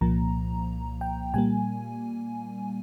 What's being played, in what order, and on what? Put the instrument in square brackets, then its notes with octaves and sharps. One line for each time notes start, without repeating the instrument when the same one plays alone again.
[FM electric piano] C2 A#2 F3 A#3 A#5
G5
A#2 G3 A#3 G#5